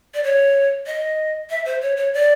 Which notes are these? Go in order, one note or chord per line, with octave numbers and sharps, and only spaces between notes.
D5
C#5
D#5
E5
C5
C#5
C#5
D5